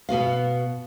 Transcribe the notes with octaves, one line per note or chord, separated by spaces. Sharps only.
B2 B3 F#4 F5